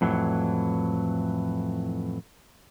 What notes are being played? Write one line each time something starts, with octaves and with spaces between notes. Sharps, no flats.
F2 A2 E3 F#3